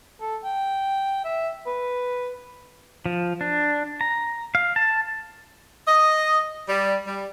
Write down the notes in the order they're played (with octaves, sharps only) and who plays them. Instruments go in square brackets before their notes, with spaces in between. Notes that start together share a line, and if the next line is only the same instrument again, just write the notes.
[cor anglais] A4
G5
E5
B4
[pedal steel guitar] F3
D4
A#5
F5
A5
[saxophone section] D#5
G3
G3